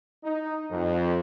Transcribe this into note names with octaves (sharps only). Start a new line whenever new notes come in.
D#4
F2